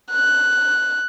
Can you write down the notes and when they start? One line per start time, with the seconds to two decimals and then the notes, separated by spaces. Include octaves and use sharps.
0.10 F#6